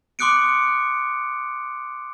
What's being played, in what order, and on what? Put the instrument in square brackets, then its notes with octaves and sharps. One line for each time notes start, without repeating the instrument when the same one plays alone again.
[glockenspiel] C6 D6 D#6 F#6 C#7 D7